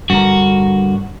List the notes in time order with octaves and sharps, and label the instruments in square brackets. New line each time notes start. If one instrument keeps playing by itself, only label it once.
[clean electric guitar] G2 D3 A#4 [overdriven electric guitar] F#4